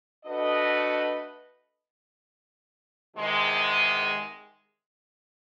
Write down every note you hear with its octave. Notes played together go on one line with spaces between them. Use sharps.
A3 D4 F#4 B4 D#5
E2 C3 D#3 G#3